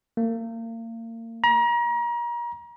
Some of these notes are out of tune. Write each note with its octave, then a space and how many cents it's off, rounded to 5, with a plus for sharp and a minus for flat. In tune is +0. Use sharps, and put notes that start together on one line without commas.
A#3 -35
A#5 +35